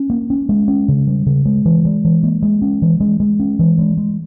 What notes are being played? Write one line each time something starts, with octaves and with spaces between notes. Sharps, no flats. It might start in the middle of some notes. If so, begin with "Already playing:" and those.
Already playing: C#4
A#3
C#4
G#3
C#4
C#3
G3
C#3
G#3
E3
G#3
E3
A#3
G#3
C#4
E3
G#3
G#3
C#4
E3
G#3
G#3